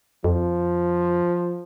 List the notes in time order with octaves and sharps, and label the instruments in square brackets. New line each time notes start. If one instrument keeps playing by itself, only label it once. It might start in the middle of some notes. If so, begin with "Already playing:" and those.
[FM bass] F2 [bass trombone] F3